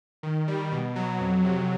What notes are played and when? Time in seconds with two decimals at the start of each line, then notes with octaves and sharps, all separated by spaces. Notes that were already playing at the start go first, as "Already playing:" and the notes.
0.23 D#3
0.48 G3
0.72 B2
0.96 F#3
1.20 F2
1.44 C3